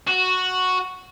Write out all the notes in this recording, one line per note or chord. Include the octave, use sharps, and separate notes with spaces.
F#4